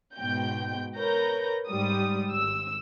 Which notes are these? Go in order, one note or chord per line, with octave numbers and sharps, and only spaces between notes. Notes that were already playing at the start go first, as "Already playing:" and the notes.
G#2 B2 G5 G6
A#4 B4 C#5 G6 A#6
G#2 G3 D#6
G#1 E6